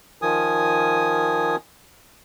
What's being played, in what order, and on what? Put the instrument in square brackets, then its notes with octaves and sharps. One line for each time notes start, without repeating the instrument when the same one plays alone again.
[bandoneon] D#3 F3 G#5 D#6